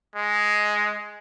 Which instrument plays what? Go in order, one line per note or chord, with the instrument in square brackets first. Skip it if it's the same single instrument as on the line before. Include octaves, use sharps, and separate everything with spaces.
[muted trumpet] G#3